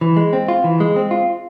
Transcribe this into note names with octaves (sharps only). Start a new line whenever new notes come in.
E3
G#3
C4
F4
E3
G#3
C4
F4